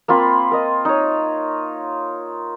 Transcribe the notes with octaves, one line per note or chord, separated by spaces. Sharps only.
A#3 C4 F4 B5
A#4 D#5
D#4 C#5